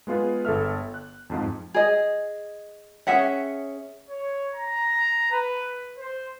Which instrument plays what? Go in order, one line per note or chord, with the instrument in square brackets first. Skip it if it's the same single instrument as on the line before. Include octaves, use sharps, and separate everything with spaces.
[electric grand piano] G#3 B3 F4 G#4 B4
G1 A4 E5 F6
F#6
F2 G#2 F3
[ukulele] G#4 D#5
C#4 G#4 E5 F#5
[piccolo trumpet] C#5
A#5
B4
C5